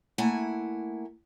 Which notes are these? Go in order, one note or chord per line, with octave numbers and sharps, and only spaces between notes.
A3 A#3 E4 F#5 G#5